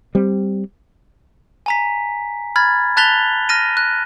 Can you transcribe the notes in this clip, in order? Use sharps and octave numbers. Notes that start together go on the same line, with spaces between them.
G3 C4
G#5 A#5 B6
B5 F6 G#6 A6
A5 F#6 A6 B6 F7 G7
F6 A#6 D#7
F#6